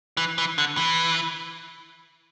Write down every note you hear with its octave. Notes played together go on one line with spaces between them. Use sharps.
E3
E3
D3
E3